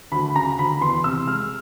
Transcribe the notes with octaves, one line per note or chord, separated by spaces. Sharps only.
D2 B5
C#3 A#5
D2 B5
E2 C6
C3 E6
G#3 F6